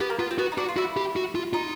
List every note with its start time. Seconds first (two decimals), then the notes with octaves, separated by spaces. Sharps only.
0.01 B3 G4
0.10 A#3
0.19 B3 F4
0.31 C4
0.38 B3 F#4
0.52 D#4
0.57 D4 F#4
0.68 F4
0.77 E4 F#4
0.97 G4
1.16 F#4
1.35 F4
1.53 D#4 F4